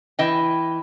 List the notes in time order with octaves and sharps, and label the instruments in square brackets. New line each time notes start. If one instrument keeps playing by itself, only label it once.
[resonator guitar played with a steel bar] E3 D#5 G5